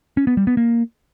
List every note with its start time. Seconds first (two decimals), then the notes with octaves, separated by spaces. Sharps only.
0.17 C#4
0.27 B3
0.37 G3
0.47 B3
0.57 A#3